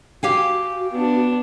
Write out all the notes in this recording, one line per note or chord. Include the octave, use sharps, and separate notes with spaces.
F#4 G4 F5 G#5
B3 D4